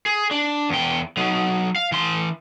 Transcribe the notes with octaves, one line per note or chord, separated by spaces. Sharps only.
G#4
D4
E2 G5
F#3 D#4
F5
E3 C6